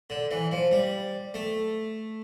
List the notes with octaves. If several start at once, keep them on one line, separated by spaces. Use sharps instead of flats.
D3
E3
F3
G3
A3